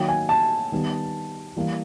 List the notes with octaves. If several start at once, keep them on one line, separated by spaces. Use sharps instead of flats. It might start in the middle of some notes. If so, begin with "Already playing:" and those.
Already playing: D#3 F#3 A#3 G5
G#5
A5
D#3 G3 B3
E3 G3 A#3